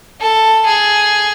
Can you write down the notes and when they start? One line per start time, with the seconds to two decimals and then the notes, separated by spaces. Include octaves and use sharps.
0.21 A4
0.66 G#4